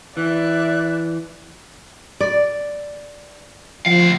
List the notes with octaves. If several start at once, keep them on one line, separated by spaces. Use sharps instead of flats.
E3 D5 E5 F#6
D5
D2 F3 F5